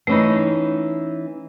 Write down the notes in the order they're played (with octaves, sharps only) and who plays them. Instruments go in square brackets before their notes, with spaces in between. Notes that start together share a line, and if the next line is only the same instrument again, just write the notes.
[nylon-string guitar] E3 C#4 D#4 [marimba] A3 B5